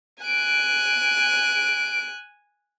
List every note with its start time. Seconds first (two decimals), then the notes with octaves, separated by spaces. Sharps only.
0.24 G#5 F#6 D7